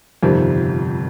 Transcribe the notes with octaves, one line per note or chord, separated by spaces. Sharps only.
G1 F2 C3 D#3 G3 C4